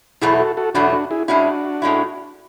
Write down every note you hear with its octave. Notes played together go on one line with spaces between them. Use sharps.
E2 B2 F#3 A3 E4 G#4
F#4 A4
F#4 A4
E2 B2 F#3 A3 D4 F#4
D4 F#4
E4 G#4
A2 G#3 C#4 D4 E4 F#4
A2 G#3 C#4 E4